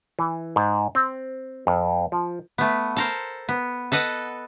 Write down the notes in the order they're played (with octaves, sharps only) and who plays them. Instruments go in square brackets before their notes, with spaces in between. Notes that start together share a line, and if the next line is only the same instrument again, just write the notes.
[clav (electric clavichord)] E3
G#2
C4
F2
F3
[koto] A3 B3
A4 A#4 C5
B3
A4 B4 D#5 F#5